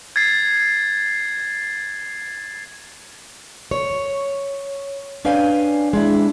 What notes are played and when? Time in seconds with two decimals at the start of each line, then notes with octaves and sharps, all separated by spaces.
0.16 G#6 A6 C7
3.71 C#5
5.25 C#4 D4 B4 F5 G5 G#5
5.93 G#3 D4 E4